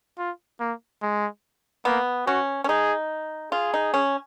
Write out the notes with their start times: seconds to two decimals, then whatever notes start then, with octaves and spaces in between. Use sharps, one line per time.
0.18 F4
0.60 A#3
1.02 G#3
1.85 A#3 B3
2.27 C#4 F#4
2.64 C#4
2.69 D#4 G#4
3.52 F4 G#4
3.74 D#4
3.94 C#4